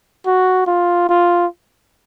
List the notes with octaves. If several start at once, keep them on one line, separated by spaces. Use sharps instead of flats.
F#4
F4
F4